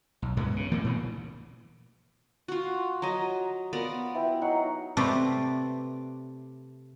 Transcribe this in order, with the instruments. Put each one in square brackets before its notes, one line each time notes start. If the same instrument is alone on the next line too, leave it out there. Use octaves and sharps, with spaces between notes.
[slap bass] B1
C#2 G2 G#3 B3
C#3
E3 A3 A#3
D2 A#2
[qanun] F4 F#4
[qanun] F#3 D#5 [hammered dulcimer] A#5
[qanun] B3 A#4 D5 [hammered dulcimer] F4
[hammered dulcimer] E3 E5 G5
F#3 D#4 F#5
[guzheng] C3 A3 B4 D5